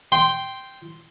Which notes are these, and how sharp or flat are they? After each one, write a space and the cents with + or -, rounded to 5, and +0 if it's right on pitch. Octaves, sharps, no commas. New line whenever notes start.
G5 -5 C6 +0